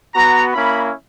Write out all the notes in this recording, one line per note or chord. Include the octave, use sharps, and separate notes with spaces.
B3 F#4 A#5
A#3 C#4 E4 B5